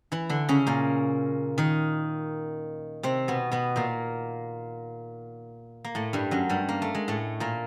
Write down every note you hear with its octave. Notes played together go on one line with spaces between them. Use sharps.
E3 E4
D3 D4
C#3 C#4
A#2 A#3
D#3 D#4
C3 C4
B2 B3
B2 B3
A#2 A#3
A#3
A2 A3
G2 G3
F#2 F#3
G2 G3
A#3
A3
G#3
A2 A3
A#2 A#3